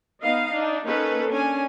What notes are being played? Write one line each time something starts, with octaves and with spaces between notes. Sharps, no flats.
B3 D#4 D#5 F5
D4 D#4
A#3 C#4 D#4 A4 B4
C#4 D4 G#5